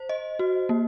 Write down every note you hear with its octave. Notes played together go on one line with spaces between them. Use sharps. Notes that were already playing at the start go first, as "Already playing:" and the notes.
Already playing: C5
D#5
F#4
A#3